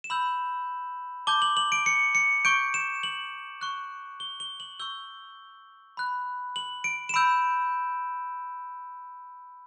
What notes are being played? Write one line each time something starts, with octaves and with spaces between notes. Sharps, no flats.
E7
B5 E6 G6 F#7
A5 D6 G6 G7
F#7
F#7
D7
C#7
C#7
C#6 G6 D7
E7
F#7
C#6 F#6
G7
G7
F#7
C#6 E6 G6 G7
B5 F#6
F#7
D7
E7
B5 E6 G6 D7